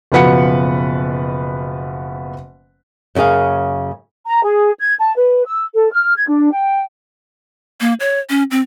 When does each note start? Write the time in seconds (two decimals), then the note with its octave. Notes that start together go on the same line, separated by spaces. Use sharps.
0.12 F#1 B2 F3 B4 F#5 C#7
3.15 F#2 C#3 A#3 G#4 F5
4.26 A#5
4.45 G#4
4.80 G#6
5.01 A5
5.15 B4
5.46 E6
5.75 A4
5.92 F6
6.16 G#6
6.28 D4
6.53 G5
7.81 A#3
8.00 C#5
8.30 C#4
8.51 C4